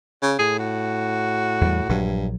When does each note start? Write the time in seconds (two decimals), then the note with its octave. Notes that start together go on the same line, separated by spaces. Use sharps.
0.22 C#3
0.39 A2 G#4
0.60 F#4
1.61 E2 G3
1.89 A#1 G2 F#3